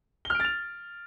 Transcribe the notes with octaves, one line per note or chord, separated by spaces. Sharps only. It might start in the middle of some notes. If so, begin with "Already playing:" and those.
F6 A6 D7 F7 G7